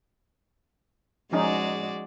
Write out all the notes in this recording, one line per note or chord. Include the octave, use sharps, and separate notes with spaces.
F3 G#3 C#4 D#4 F#4 D5